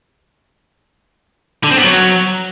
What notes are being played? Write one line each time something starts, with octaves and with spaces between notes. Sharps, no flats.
D3
C4
B3
F#3